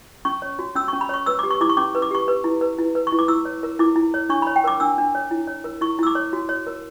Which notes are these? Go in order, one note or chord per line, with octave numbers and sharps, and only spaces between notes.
C#4 C#6
C#5
F#4
C#4 E6
C#4 C#6
B5
C#5 C#6
B4 E6
G4 D6
C#6
E4 D6
C#6
C#4 D6
B4
D6
G4 C#6
B4
E4
B4
E4
B4
C#6
E4
D6
E4 E6
C#5
A#4
E4 D6
E4
C#5
D4 C#6
C#5 B5
G5
A#4 D6
D4 E6
D4
C#5
E4
C#5
A#4
E4 C#6
E4 E6
D6
C#5
F#4
C#5
A#4